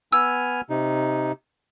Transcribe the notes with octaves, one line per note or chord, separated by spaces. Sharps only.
B3 G#5 E6 F6
C3 D#4